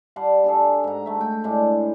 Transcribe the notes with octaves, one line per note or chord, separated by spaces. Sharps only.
G3 F#5 A5 C6
D4 G#4 A4
G#2 A#5
A3 E5
G5
A2 G#3 D4 D6